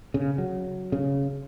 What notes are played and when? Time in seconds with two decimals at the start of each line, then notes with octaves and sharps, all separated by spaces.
0.14 C#3
0.38 F#3
0.92 C#3